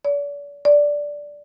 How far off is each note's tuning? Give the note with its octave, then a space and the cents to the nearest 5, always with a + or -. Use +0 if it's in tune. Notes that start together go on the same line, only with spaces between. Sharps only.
D5 -40
D5 -5